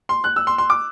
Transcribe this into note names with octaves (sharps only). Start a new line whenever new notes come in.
C6
F#6
E6
C6
C6
D6